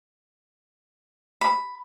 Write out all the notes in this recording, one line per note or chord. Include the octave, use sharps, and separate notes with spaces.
B5